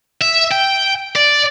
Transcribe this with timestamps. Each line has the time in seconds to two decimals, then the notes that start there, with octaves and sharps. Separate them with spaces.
0.22 E5
0.52 G5
1.15 D5